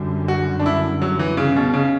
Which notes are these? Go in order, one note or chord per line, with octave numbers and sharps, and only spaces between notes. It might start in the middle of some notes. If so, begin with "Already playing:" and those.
Already playing: F#2 D3 G3
F#4
D4
E4
F#3
E3
C#3
B2
C#3